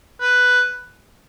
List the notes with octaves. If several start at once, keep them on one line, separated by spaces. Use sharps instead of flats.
B4